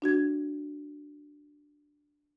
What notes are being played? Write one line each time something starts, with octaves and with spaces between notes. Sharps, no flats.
D4 F#4 G#6